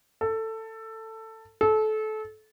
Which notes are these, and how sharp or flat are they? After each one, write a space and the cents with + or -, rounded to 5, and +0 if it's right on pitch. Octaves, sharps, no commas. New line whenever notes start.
A4 +15
A4 -25